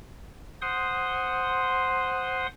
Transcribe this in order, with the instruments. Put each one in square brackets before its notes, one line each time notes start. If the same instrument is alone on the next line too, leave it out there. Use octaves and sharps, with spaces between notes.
[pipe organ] C5 F#5 C6 D#6